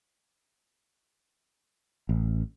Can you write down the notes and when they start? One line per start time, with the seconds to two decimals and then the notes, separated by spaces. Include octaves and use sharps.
2.09 A1